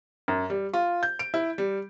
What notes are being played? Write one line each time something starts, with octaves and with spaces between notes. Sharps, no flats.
F#2
G3
F4
G6
D7
E4
G3